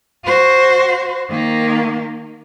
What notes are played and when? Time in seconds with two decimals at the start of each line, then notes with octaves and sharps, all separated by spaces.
0.25 F#4 C5
1.30 D#3 A#3